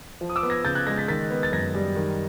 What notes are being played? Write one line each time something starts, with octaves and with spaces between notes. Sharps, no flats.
F3
D#6
D6 E6
B3
G#6 A#6
C#3 G6 A6
F#6 G#6
G#3 G#6 A#6
A6 B6
D#3 A6 B6
B3
A6
F#2 G#6 A#6
G3
D#3